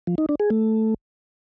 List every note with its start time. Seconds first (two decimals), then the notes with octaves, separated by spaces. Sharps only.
0.07 F3
0.18 D#4
0.29 D4
0.40 G#4
0.50 A3